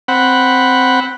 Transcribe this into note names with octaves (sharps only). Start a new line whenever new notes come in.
C4 F#5 B5